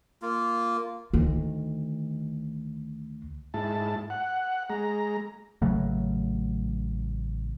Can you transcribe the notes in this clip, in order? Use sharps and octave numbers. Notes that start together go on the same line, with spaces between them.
A#3 F4
D2 D#3
G#2 E4 A5
F#5
G#3 A#5
A1 C#3 F#3 A3